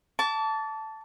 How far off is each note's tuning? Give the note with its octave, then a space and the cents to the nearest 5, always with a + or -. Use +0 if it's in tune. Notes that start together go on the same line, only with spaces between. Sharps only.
A5 +0 D6 -40